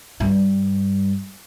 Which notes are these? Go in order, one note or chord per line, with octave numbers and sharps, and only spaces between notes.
G2 G3